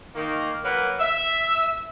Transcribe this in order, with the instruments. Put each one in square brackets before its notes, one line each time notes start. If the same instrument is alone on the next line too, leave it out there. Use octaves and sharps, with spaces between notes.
[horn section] D#3 A#3
F#3 A#3 A#4 B4
E5